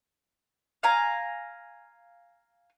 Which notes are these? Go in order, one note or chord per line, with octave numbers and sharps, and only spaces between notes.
F5 G#5 A#5